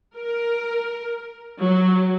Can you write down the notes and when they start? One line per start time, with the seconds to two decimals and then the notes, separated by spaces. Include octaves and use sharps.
0.16 A#4
1.61 F#3